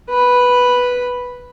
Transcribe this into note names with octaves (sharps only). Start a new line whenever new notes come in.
B4 B5